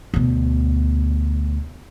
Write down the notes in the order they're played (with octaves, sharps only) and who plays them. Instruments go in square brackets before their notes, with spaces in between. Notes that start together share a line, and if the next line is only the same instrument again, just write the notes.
[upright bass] D2 B2